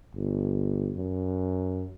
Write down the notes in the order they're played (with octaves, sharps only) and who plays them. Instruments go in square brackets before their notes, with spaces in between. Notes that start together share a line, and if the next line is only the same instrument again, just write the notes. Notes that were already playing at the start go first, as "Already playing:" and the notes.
[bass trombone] G1
F#2